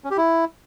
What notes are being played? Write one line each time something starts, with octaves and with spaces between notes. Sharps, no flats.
C#4
G4
E4